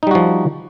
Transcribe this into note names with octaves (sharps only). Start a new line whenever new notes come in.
F3 G3 D#4 F#4